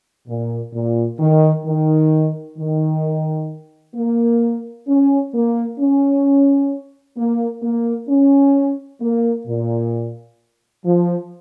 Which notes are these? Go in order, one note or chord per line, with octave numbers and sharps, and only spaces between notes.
A#2
A#2
D#3
D#3
D#3
A#3
C#4
A#3
C#4
A#3
A#3
C#4
A#3
A#2
F3